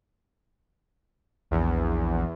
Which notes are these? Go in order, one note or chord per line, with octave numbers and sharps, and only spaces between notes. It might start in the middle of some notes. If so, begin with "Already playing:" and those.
A#1 E2